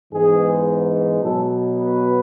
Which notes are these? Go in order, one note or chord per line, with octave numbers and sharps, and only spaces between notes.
G#2 E3 G#3 B3 G#4
B2 F#3 B3 A4
B4